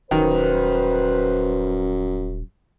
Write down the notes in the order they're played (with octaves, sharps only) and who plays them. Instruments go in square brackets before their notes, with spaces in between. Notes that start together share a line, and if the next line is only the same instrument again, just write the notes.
[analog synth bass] D#1 [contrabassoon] F#2 [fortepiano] D#3 [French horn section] B4 C5